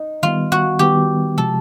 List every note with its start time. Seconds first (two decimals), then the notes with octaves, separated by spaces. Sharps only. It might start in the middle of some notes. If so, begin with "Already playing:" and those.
Already playing: D#4
0.23 D#3 G3 B3 F4
0.52 F#4
0.79 D#3 G3 B3 G4
1.38 C3 F3 G#3 A4